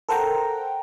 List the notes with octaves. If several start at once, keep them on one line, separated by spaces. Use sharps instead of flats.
A4 A#4 C5 F#5 G5 A#5